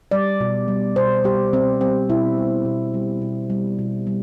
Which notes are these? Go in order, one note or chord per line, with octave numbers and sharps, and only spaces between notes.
G3 D5
B2
G3
B2 C5
G3 G4
B2 C4
G3 C4
B2 E4
G3
B2
G3
B2
G3
B2
G3